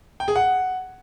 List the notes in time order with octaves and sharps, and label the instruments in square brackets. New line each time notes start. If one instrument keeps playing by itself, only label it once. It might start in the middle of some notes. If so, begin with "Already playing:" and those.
[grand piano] G5
G#4
F#5